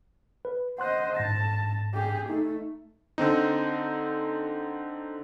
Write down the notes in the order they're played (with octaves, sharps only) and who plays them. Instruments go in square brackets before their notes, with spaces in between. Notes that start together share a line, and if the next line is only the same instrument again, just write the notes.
[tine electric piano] B4
[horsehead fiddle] C5 D#5 [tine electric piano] F#5 C6 F#6
[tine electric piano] G#2 A#6 [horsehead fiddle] A5
[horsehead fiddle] G4 G#4
[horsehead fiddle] A3 [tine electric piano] D#4
[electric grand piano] D3 C4 D#4